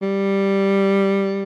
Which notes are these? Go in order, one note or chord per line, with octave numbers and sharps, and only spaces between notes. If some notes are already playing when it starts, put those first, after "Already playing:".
G3